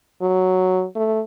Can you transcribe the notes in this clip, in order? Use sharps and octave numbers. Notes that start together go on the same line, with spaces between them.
F#3
A3